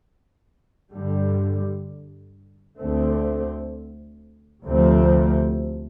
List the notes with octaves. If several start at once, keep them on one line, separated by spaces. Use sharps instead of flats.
G2 D3 G3
D2 D3 A3 C4
D2 C3 F3 A3 C4